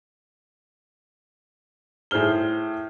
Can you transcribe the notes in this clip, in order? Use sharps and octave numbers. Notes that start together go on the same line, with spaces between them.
A2 G#4 C5 F6 G7